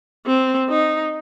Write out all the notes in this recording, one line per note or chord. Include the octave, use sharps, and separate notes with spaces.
C4
D#4